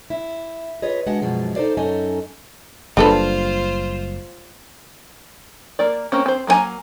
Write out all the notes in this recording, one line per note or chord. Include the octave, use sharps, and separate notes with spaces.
E4
F4 G#4 B4 C#5 D#5
G#3 D4 F#4 D#5 F#5
F#2 B2 F3 G#3
D#4 A4 B4 C5 D5 F5
F#2 C#4 D#4 A4 D#5 G#5
F#1 G3 A#3 D4 F4 A4 B4 C5
A#3 A#4 D5
A#3 C4 C#4
C4 C5
F#3 A#3 D#4 G#5 A#5